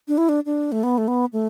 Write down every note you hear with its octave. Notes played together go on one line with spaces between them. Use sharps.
D4
E4
D4
D4
A3
B3
A3
B3
A3